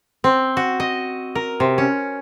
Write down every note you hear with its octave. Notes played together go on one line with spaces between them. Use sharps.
C4
F#4
D#5
A#4
C3
C#4